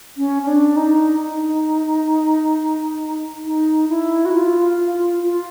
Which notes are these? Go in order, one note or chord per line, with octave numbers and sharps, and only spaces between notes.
C#4
C#4
D4
D#4
D#4
D#4
E4
F#4
F4
F4